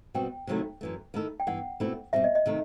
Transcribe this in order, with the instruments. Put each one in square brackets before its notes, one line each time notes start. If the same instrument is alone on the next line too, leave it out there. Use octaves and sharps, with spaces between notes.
[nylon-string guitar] B2 G3 C4 F#4 [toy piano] G5
[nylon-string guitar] C3 D#3 F#3 A3 E4
F#2 E3 A3
D#3 A3 E4 A4
[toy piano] G5
[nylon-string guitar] G2 E3 B3 [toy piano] F#5
[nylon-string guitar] B2 A3 C4 E4 G4
[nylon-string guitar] B2 G3 C4 [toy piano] E5
[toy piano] D#5
D#5
[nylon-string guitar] C3 D#3 A3